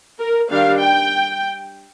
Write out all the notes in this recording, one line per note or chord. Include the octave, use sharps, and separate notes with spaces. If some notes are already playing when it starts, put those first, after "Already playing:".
A#4
D#3 G3 D4 F5
G5